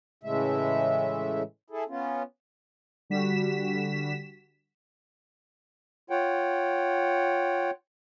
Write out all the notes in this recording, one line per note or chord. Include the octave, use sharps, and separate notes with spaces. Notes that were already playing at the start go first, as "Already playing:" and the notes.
A2 C#3 E3 G#3 A3 E5
E4 G#4 A4
B3 C#4 F4
D3 G3 F#4 B6 E7
F4 C#5 F#5 G5